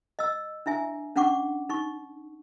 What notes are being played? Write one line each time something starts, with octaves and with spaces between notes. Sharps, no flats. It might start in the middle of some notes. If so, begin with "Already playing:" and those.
D#5 E6
D4 E4 E5 G#5
C#4 D4 F#5 C#6 D6
D#4 C#6